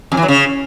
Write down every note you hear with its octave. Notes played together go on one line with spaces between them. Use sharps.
F2
E3
F#3
C#3